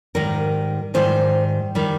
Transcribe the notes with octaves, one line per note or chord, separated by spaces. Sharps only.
G#2 D#3 G3 A#4
G#2 D#3 G3 C5
D#3 G3